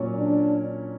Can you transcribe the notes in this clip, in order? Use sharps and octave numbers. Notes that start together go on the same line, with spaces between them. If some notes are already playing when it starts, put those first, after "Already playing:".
Already playing: A#2 F#3 C#4
D4